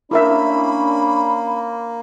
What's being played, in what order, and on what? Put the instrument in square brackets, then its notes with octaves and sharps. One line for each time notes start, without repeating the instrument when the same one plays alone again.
[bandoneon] A#3 [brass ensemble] C#4 D4 [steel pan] E4 A#4 E5 [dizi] B5